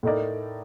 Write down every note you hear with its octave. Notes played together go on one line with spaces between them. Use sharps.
A2 A3 D#4 A#4 D5